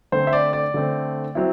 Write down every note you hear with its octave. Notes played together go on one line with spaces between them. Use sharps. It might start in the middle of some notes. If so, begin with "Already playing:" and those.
D3 A3 C4 C5
E5
D5
D5
D3 A3 C4
F#3 C4 E4